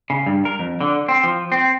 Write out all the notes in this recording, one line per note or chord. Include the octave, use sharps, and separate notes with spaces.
C#3
G2
A#4
F2
D3
C4
F3
C4